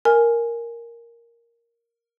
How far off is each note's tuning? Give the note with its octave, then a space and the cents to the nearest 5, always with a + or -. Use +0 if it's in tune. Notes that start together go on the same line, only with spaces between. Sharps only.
A#4 +0 G#5 +0